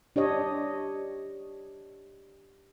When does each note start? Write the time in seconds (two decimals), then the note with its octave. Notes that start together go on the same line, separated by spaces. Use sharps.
0.16 D4 G4 C#5 D#5